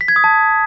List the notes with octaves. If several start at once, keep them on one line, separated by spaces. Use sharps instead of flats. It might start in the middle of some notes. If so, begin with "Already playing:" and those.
B6
G#6
D#6
A5